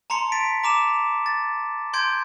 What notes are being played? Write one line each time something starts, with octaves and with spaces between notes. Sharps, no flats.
A5 A#5 C6 C#7
A6 B6 D7
A#5 D6 E7
A6
C6 G6 G#6 D7